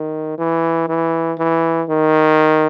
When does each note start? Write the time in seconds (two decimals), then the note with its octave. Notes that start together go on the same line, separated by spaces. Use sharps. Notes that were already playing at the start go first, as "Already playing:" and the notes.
Already playing: D#3
0.38 E3
0.88 E3
1.39 E3
1.89 D#3